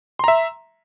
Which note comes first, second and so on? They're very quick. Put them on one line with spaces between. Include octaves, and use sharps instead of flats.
C6 A#5 E5